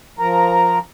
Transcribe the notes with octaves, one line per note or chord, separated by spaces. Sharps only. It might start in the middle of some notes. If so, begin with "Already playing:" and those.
F3 A#4 A#5